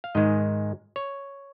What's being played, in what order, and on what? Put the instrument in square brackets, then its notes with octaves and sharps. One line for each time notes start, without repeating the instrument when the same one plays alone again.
[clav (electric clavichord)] F5
G#2 D#3 G#3 D#5
C#5